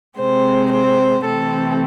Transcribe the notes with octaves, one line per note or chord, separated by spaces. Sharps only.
C3 G#3 C4 C5
C5
C3 E3 A3 C4 A4